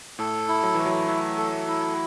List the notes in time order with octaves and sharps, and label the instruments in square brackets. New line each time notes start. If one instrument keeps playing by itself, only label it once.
[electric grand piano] A2 [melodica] A4
[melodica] E4
[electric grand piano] F#3
[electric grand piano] E3 [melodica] A3
[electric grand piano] F#3
[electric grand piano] E3 [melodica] E5
[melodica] A4
E4